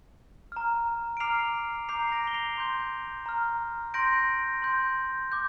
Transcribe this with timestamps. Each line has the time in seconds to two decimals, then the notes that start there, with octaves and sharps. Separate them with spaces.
0.52 A#5 F6
1.17 D7
1.20 A#5 D6 F6 C7 F7
1.89 A#5 D6 G6 C7 F7
2.12 A#6 D7
2.27 G7
2.34 C7 F7
2.57 C6 G6
3.26 A#5 F6
3.94 C6 G6 A#6 D7
4.62 C6 G6
5.32 D6 G6